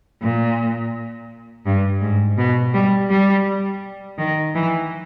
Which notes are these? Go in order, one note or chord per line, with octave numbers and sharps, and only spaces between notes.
A#2
G2
G#2
B2
G3
G3
D#3
E3